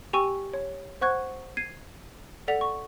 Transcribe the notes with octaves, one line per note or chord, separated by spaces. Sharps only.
G4 G5 G#5 C#6 E6 D#7
C#5
C5 F#5 C#6 F#6 G#6
G#6 C7 D#7
A4 D5 F#5 B6 F7
C#6